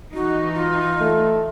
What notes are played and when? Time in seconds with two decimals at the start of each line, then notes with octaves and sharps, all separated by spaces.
0.14 E3 D#4 F#4
0.54 F4
1.01 A3